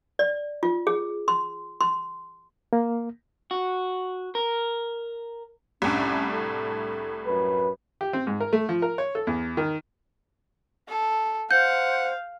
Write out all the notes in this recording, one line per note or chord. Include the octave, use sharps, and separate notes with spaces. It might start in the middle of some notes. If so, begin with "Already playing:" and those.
D5
F4
G#4
C6
C6
A#3
F#4
A#4
C2 A2 C#4 D4
A4
F#2 B4
G4
C4
G#2
A#4
A3
F3
A#4
C#5
A4
E2
D#3
A4
C5 F5 F#5 G6